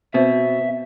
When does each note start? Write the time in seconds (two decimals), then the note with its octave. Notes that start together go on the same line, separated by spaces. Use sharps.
0.14 B2 C4 E5